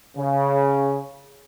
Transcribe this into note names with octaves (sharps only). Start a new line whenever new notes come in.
C#3